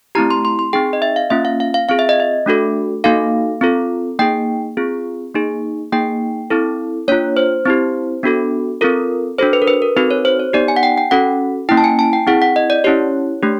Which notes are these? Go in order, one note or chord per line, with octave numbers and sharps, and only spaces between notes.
A3 C4 E4 G4 A#5
C6
C6
C6
C4 D#4 G#4 G5
D#5
E5
F5
A#3 C#4 F4 E5
F5
F5
F5
C4 F4 G#4 F5
E5
D#5
E5
A3 D4 F#4 A4
A#3 D#4 F#4 A4 F5
C4 F4 A4
A#3 D#4 G#4 G5
C4 F4 G#4
A#3 D#4 G#4
A#3 D#4 G#4 G5
C4 E4 A4
A#3 D4 F4 C#5
C5
C4 E4 G4
B3 D4 F#4 A4
C4 F4 A4 A#4
D4 F#4 A4 C5
B4
A#4
B4
A#4
C4 D#4 F#4 A4 B4
C#5
C5
C#5
B3 D#4 G4 D5
G#5
F#5
G5
G5
C#4 F#4 A4 F#5
A#3 C#4 E4 G5
A5
G#5
A5
G5
C4 E4 G#4 F#5
F#5
D#5
D5
C#4 E4 G4 C#5
A3 D4 G4